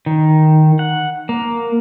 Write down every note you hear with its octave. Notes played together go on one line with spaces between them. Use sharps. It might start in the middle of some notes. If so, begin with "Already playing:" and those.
D#3
F#5
A#3